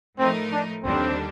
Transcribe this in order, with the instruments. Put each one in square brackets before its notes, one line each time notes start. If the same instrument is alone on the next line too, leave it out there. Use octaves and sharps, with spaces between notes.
[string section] A2 F3 A3 D#4 A#4 [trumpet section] C4
[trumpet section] D4
[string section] D#2 D3 G3 D4 [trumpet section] C4